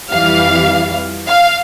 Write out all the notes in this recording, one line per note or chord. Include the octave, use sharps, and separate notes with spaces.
F2 E3 G3 F5
F5